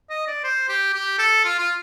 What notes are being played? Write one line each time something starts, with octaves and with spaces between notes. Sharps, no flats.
D#5
D5
C5
G4
G4
A4
F4
F4